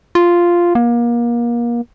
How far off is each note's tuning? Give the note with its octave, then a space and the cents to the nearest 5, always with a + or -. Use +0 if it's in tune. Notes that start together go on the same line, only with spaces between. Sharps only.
F4 -5
A#3 +30